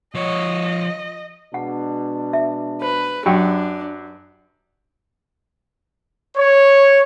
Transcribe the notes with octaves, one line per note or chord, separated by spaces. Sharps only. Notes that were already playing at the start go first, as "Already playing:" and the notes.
F3 C#5 D#5
B2 G#3 D4 F#5
E5
B4 C5
F#2 D4 G4 G5
C#5